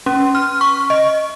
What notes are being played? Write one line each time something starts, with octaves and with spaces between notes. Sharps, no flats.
C#4
F6
C#6
D#5